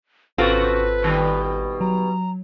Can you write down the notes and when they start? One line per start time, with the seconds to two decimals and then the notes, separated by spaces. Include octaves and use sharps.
0.38 G#1 C#3 C4 F4 F#4 A4 B4
1.02 B2 D#3 G3
1.81 F#3 A#5